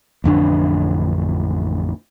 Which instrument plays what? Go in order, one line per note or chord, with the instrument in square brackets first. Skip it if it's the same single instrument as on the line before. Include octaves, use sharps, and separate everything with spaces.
[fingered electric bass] A1 F2 D3 D4